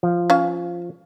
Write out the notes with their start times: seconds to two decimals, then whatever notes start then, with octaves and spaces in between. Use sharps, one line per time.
0.03 F3
0.30 C#4 F5